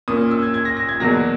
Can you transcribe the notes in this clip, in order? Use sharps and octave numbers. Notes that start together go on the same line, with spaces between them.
A#2 A#3 C#4 D#6
E6
G#6
G#6
A#6
A#6
G#6
E2 B2 F#3 A#3 A#6